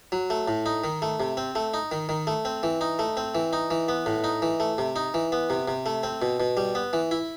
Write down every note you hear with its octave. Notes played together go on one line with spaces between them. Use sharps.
F#3
A3
A2
D#4
D#3
A3
C3
C4
A3
D#4
D#3
D#3
A3
C4
E3
D#4
A3
C4
E3
D#4
E3
B3
A2
D#4
E3
A3
C3
D#4
E3
B3
C3
C3
A3
C4
B2
B2
G3
B3
E3
E4